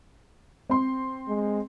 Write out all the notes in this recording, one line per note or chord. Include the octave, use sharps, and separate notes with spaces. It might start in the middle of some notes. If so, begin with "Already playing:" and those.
C4 C6
G#3